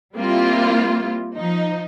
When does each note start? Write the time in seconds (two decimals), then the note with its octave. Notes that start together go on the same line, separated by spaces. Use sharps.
0.15 G3 A#3 C4 E4 F4
1.36 F3 D#4